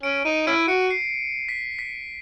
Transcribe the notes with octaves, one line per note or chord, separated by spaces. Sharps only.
C#4 D7
D#4 D#7
C#4 E4 D7
F#4 C#7
C7
B6
B6